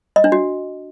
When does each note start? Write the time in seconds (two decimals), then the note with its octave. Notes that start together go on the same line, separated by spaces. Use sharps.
0.16 D#5
0.24 D4
0.32 F#4